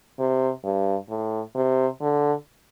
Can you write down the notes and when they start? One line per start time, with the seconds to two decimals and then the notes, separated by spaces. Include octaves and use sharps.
0.19 C3
0.64 G2
1.09 A2
1.55 C3
2.01 D3